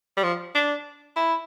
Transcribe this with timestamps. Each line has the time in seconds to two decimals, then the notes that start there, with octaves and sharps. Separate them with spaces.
0.17 G3
0.24 F3
0.55 D4
1.16 E4